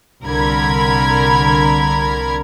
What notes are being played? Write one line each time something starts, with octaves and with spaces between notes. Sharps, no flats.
C2 D3 A#4 B5 G#6